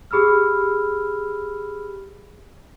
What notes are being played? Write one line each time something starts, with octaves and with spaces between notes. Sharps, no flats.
G4 G#4 B5 E6 F6